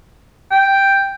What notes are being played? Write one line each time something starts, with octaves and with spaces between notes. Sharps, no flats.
G5